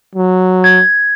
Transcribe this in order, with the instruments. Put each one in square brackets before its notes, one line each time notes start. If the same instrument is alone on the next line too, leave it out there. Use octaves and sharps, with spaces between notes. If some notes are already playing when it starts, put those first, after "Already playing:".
[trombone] F#3
[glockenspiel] G#6